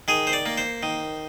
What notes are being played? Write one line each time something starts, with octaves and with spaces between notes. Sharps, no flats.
D#3 G#4
C5
D5
A#3
C5
D#3